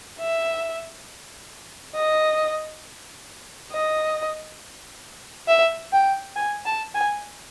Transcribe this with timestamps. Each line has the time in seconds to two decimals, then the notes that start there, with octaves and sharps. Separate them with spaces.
0.19 E5
1.96 D#5
3.72 D#5
5.48 E5
5.92 G5
6.36 G#5
6.65 A5
6.94 G#5